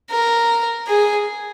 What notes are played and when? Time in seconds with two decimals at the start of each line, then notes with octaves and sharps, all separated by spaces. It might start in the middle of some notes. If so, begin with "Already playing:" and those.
0.10 A#4
0.87 G#4